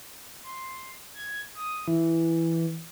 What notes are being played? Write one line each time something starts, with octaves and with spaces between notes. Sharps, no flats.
C6
G#6
D#6
E3